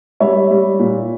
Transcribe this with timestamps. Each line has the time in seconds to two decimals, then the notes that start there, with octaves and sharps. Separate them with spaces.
0.20 G3 C#5 E5
0.51 G3
0.79 A#2